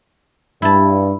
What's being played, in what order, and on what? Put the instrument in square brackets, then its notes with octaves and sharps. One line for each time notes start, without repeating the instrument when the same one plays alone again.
[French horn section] G2 [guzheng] E4 A5